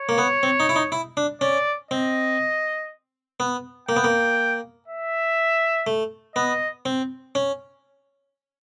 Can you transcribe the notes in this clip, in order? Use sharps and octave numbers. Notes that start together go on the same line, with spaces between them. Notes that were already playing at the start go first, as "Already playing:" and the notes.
Already playing: C#5
A#3
B3
C4
D#4
E4
D#4
E4
D4
C#4 D5
C4 D#5
B3
A#3 G5
B3
A#3
E5
A3
B3 D#5
C4
C#4